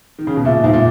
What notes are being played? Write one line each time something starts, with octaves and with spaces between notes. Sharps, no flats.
D#3
C#3
B2
A#2 E5
G#2 E5
A#2